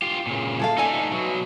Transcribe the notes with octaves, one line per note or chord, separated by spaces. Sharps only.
F4 G4
A#2 C#3
G#4 A4 F5
A3 D#4 A4 D5 G#5
B2 F#3